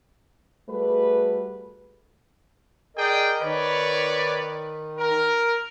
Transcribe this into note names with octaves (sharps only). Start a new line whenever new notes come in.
G3 A3 F#4 G#4 B4
G#4 A#4 D5 D#5 G5
D#3 B4 C#5 D5
A#4